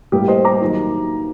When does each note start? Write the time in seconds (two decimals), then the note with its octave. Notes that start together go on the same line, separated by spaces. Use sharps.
0.12 A2 G3 A#3 G4
0.28 C5 D#5
0.45 A#5 D6
0.61 D#3 F#3 A#3